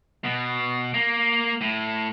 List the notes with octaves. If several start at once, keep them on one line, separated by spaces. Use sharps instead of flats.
B2
A#3
A2